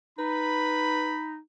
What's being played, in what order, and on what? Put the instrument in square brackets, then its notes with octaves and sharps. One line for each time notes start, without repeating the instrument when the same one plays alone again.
[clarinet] D#4 [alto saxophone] B4 [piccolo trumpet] B5